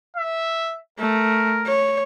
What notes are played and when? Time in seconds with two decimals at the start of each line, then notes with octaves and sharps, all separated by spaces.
0.17 E5
0.99 A3 A#4
1.66 C#5